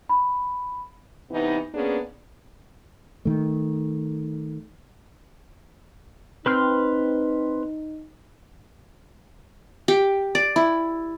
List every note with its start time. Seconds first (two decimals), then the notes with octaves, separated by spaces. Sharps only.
0.09 B5
1.31 C3 E3 B3 D#4
1.74 A#3 B3 C#4 D4 G#4
3.25 D#3 A3
6.46 C4 D#4 B4 C6 F6
9.88 G4
10.35 D5
10.56 E4